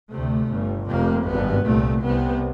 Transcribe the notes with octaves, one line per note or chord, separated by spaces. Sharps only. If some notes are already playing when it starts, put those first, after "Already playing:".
D2 C3 A3
G1 G2
F1 F2 C3 A#3
G#1 G2 B3
C2 A#2 A3
C2 C3 B3